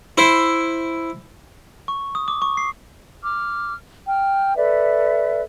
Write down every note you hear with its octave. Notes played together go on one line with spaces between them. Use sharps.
E4 C5
C#6
D#6
D6
C#6
C7
D6 F6
G5 F6
A4 B4 D5 E5